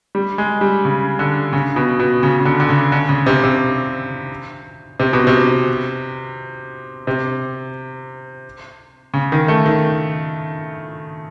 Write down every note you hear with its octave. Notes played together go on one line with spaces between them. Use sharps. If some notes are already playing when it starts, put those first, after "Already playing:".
G3
G#3
G3
C#3
D3
C#3
B2
B2
C#3
C#3
D3
D3
C#3
D3
C#3
C3
C3
C3
B2
C3
C3
C#3
D#3
A3
D#3